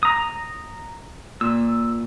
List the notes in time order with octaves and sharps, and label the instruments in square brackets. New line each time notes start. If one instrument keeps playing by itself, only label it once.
[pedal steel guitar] A#5 D#6
[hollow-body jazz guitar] A#2 [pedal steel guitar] E6